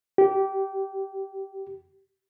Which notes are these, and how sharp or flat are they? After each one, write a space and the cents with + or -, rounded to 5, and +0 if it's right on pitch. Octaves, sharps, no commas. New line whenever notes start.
G4 -20